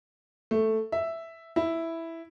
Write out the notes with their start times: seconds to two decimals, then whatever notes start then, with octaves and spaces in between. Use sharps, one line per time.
0.51 A3
0.92 E5
1.56 E4